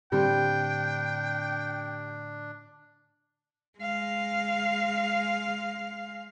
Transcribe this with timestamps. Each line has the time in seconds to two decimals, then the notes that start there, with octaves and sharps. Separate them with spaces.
0.12 A2 D3 G3 C4 D4 G5
3.79 G#3 F5